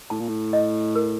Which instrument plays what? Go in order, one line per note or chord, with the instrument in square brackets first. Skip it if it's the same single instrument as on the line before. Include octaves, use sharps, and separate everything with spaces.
[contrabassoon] A2 [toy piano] A5
[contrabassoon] A#2
A2
[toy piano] D#5
A#4